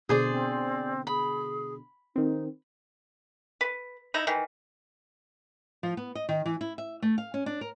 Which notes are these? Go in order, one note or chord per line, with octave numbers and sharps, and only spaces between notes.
B2 D3 G#4 C5 D5
C4
G#4 B5
D#3 C4 D#4
B4
D#4 E4 A#5
D#3 E3
F3
B3
D#5
D#3
E3
E4
E5
A3
F5
C#4
D4
A#4